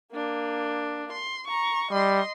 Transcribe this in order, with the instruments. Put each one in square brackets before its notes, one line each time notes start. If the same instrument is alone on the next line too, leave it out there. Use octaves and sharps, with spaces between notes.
[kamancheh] A#3 D4
C6
A#5 C#6
[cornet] G3 [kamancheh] D#5 C6